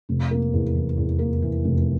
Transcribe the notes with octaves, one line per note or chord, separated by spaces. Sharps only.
F1
A#3
E2
E3
E2
A#3
E3
F1